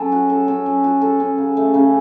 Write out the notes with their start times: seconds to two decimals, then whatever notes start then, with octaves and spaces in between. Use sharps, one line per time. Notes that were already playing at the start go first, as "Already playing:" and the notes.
Already playing: F#3 C#4 A4
0.12 F#4
0.30 A4
0.48 C#4
0.66 F#3
0.84 F#4
1.01 A4
1.20 C#4
1.38 C#3
1.57 A3
1.74 C#3